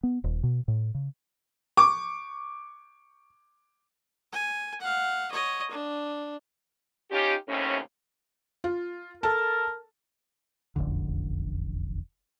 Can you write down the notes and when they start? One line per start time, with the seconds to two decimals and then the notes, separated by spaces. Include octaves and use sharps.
0.03 B3
0.24 D#1
0.43 B2
0.68 A2
0.95 C#3
1.77 C#6 D6
4.33 G#5
4.81 F5 F#5
5.31 C#5 D#5
5.71 D4
7.11 C#4 D#4 F4 G4
7.48 D#2 A2 C3 C#4
8.64 F4
9.23 A4 A#4 A5
10.76 E1 A1 F2 D3